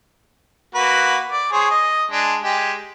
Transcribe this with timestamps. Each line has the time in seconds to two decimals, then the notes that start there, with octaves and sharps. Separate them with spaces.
0.75 A#3 F#4 B4
1.32 D5
1.52 G#4 C5 C#5
1.71 D#5
2.11 G#3 D4
2.42 G#3 G4